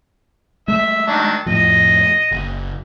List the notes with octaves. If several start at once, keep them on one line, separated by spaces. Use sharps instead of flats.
G#3 A3 E5
D#3 F#3 D4
F2 A2 F3 D#5
F#1